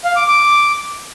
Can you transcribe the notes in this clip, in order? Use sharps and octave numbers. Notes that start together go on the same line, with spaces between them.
F5
D6
D6